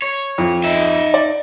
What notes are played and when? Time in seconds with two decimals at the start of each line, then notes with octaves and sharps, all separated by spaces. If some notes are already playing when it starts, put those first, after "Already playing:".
0.02 C#5
0.38 F2
0.64 D#4 E5
1.14 D5